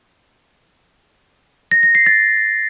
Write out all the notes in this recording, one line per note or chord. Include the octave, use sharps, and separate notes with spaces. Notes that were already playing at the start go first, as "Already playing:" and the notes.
A#6
A#6
C7
A6